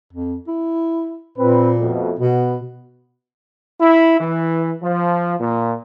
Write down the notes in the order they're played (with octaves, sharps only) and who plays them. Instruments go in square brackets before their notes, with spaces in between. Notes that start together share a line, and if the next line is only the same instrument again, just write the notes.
[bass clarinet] F2
E4
[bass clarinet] A#2 [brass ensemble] C4 B4
[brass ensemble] F2 B2 A3
[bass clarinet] B2 [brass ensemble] B3
[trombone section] E4
E3
F3
A#2